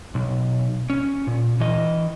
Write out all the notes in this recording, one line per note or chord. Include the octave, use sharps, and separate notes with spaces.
B1
C#4
A#2
E3 D#5